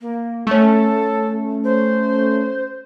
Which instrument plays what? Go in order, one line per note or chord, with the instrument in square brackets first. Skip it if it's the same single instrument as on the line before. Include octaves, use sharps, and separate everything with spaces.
[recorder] A#3
[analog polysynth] A3 C#4 [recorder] A4
[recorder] C5